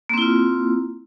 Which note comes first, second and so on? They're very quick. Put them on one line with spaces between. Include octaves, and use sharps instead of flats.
A#3 C4 E4 F4